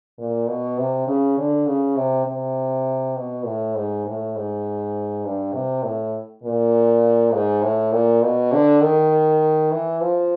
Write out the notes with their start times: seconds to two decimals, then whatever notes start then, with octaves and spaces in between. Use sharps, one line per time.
0.18 A#2
0.48 B2
0.78 C3
1.07 C#3
1.38 D3
1.67 C#3
1.96 C3
2.27 C3
3.16 B2
3.45 A2
3.75 G#2
4.06 A2
4.35 G#2
5.24 G2
5.54 C3
5.83 A2
6.43 A#2
7.33 G#2
7.62 A2
7.92 A#2
8.22 B2
8.52 D3
8.81 D#3
9.71 E3
10.01 F3